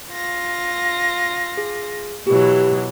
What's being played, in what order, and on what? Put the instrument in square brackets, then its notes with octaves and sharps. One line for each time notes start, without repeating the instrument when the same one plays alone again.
[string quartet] F4 A#6
[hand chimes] G#4
[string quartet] B2 E3 F#3 [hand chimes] G4